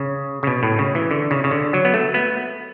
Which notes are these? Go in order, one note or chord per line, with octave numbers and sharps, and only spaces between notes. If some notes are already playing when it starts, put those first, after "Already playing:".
Already playing: C#3
C#3
B2
A2
C#3
E3
D3
C#3
C#3
D3
F#3
B3
A3
B3